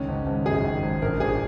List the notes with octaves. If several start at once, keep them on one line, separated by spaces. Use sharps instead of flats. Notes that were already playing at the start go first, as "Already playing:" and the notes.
Already playing: C#2 D#3 C#4
G#1
G#1
F#2 G#4
D#3
G#1
A#1 A#4
A#1 G#4